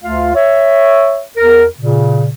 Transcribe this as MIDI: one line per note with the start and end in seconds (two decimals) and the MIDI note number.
0.03 0.32 38
0.03 0.32 57
0.03 0.32 65
0.03 0.32 77
0.35 1.22 73
0.35 1.22 76
1.37 1.65 40
1.37 1.65 70
1.79 2.30 46
1.79 2.30 49